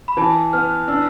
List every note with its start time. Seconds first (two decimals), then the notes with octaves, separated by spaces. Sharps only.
0.08 B5
0.17 E3 A5
0.53 B3 F6
0.88 D4 E6